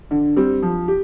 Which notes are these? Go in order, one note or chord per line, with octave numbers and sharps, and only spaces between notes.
D3
G3 C4
F3
G4